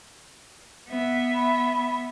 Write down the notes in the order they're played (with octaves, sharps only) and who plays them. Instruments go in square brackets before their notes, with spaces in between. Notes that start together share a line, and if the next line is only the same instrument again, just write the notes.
[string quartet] B3 E5
[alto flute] B5